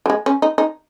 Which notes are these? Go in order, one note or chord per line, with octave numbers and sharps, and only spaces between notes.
F#3
G#3
C#4
D#4
D#4